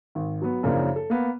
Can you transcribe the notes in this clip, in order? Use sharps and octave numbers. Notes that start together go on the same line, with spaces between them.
G#1
F#3 B3
F#2 C#3 F3 A#3 D4 E4
A4
A#3 B3